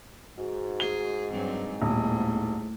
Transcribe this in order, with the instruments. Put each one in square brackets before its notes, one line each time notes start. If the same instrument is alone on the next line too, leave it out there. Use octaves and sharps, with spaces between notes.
[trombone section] G#2 [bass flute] F#4
[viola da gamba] G#4 [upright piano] G7
[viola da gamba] G2 F#3 C4
[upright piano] D#1 [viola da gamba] A2 [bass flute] B3